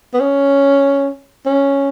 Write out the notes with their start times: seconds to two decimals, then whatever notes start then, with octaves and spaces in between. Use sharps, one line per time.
0.14 B3
0.20 C#4
1.46 C#4